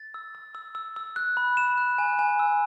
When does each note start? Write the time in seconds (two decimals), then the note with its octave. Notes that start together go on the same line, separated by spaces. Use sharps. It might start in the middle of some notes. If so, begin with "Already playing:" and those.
Already playing: A6
0.14 E6
0.35 E6
0.55 E6
0.75 E6
0.96 E6
1.16 F#6
1.37 B5
1.57 E7
1.78 F#6
1.98 G#5
2.19 G#5
2.39 E6